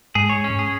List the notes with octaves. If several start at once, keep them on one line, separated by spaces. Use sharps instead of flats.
G#2 G#3 G#4
C#5
C#4
G#4